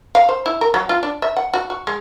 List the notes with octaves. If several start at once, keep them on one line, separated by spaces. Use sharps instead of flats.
F5
C5
E4
A#4
F#3
F4
D4
E5
F#5
F#4
F#4
G#3